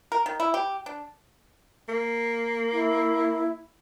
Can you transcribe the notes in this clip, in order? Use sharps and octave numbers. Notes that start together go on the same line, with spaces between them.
A#4
D#3
E4
G4
D4
A#3
E4